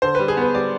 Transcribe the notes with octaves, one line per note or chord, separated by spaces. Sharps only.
D3 C5
G3 B4
G#4
B3 B4
G3 D5